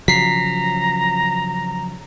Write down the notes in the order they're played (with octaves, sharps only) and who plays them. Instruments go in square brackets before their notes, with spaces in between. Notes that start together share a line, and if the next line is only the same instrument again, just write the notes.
[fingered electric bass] C#3 F3 F#3 [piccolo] A#5 [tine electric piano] B6 C7